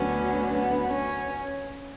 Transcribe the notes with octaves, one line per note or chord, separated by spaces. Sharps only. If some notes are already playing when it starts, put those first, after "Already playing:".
Already playing: D2 D3 F#3 B3 C#4
B3
C#4